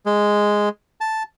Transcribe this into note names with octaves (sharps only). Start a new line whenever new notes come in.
G#3
A5